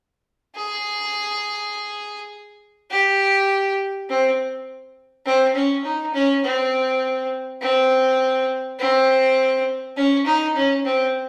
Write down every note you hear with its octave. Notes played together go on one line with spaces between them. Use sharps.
G#4
G4
C4
C4
C#4
D#4
C#4
C4
C4
C4
C#4
D#4
C#4
C4